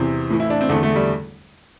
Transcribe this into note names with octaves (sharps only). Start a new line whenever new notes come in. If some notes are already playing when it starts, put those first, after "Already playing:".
Already playing: E2 C3 E3 C4
A2 E3
E4
D4
C4
E2 D3 A3
A3
G3